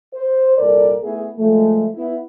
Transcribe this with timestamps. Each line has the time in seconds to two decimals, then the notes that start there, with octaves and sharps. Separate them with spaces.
0.14 C5
0.57 C2 A#2 A4 A#4 D5
1.03 A3 B3 E4 G#4
1.37 A#2 F3 G#3 A3
1.95 B3 E4